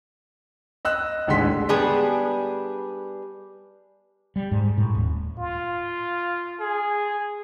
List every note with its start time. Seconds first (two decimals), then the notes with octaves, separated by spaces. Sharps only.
0.85 D#5 E6 F#6
1.27 A1 D#2 D3 G#3 C6 B6
1.69 G3 B3 D4 G#4
4.36 G3
4.51 G#2
4.78 A2
4.95 D#1
5.39 F4
6.61 G#4